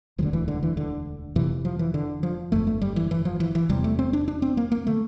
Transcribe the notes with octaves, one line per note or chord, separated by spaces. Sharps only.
E1 D2 D3 F3
E3
D3
E3
D3
F1 F2 C3 E3
F3
E3
D3
F3
G1 F2 D3 A3
A3
G3
E3
E3
F3
E3
E3
F1 E2 C3 G3
A3
C4
D4
D4
C4
A#3
A#3
D3 A3